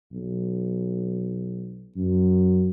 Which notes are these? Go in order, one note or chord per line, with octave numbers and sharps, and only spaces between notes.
B1
F#2